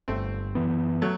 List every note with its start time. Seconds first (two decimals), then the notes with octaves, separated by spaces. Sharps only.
0.08 G1 A3 C4
0.55 F#2 E3 B3
1.02 F#3 A3